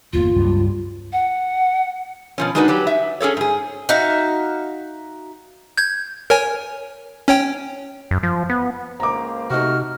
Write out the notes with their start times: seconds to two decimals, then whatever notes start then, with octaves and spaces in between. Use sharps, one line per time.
0.13 G1 E2 A#3 F4
0.35 C#2 G2 F#3
1.13 F#5
2.38 B2 F3 C#4
2.55 G#3 D4 D#4 F#4 A4 B4
2.68 F#3 G4 B4
2.87 E5
3.20 C#4 G#4 A4 C#5
3.37 G#2 G#4
3.89 D#4 F#4 E5 F5
5.78 G6 G#6
6.30 A#4 C#5 G#5
7.28 C#4 C#5 G5
8.11 F#2
8.23 F3
8.50 B3
9.00 C#2 A#3 C5 A#5 D6
9.51 C3 A3 D#4 F#4 F6